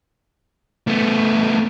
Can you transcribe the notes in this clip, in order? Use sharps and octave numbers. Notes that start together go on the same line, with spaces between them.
A3 B3